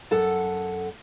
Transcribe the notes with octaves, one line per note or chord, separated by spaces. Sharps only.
F#2 A4 F#5 A5